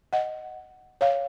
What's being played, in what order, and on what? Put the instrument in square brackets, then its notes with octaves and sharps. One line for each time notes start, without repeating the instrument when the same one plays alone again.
[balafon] D#5 F#5
C#5 F5